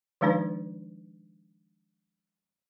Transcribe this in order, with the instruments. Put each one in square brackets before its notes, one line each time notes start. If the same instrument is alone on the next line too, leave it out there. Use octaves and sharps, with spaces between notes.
[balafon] D#3 F3 G#3 D4 D#4 B4